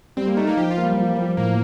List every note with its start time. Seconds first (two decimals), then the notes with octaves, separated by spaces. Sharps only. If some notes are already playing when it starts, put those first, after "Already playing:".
0.17 G3 C4
0.27 A#3
0.37 A3 D#4
0.47 A#3
0.57 F3 G4
0.71 F4
0.78 A#3
0.83 G3
0.97 F3
1.17 F3
1.37 A2 A#3